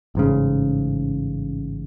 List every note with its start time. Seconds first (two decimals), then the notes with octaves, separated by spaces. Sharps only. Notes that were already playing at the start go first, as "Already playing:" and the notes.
0.15 A1 G#2 C#3